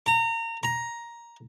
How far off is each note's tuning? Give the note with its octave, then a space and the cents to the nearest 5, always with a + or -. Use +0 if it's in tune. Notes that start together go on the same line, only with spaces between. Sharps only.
A#5 -30
A#5 +10